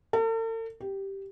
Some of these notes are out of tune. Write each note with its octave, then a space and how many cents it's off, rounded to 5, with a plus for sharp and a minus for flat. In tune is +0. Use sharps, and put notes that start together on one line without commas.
A4 +45
G4 -5